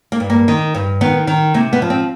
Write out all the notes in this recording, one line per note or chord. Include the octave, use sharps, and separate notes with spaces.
A#3
G2
A#3
D#3
G2
D#3 B3
D#3
C3 A#3
B3
F3
C4